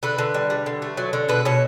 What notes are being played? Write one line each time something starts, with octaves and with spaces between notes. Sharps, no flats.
D3 B4
D3
G3
G3
D3
A3
F#3
D3
B2 B4
B2 C#5